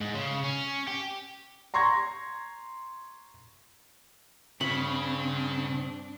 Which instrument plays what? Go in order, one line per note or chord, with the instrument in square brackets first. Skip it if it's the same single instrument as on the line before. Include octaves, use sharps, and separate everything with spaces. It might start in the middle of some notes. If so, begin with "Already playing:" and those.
[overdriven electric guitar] G#2
C#3
C#4
G4
[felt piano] A#5 C6 C#6 G#6 A#6
[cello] G2 D4 [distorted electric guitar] C#3 [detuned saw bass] C4 [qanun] B5